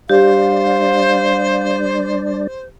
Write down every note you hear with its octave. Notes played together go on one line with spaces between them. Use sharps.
G3 D4 G4 C5 D5 F5